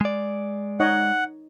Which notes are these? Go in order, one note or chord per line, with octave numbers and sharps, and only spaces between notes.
G#3 D5
D#4 C#5 D#5 F#5